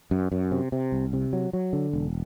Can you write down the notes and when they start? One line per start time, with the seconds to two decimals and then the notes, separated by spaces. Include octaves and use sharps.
0.11 F#2
0.32 F#2
0.52 C3
0.72 C3
0.92 C2
1.13 C3
1.33 F#3
1.53 F#3
1.73 D3
1.93 E1